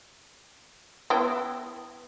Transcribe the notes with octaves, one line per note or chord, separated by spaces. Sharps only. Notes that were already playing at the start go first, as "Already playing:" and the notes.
B3 E4 G5